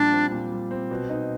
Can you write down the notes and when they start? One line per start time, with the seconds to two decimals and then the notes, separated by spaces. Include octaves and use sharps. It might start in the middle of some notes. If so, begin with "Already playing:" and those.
Already playing: A#2 F3 G3 D4
0.12 C4
0.32 A#2
0.52 G3
0.71 C4
0.91 B2
1.10 D#4